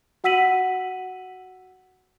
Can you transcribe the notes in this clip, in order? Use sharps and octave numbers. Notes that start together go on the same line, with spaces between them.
F#4 F#5 E6 B6 D#7 F#7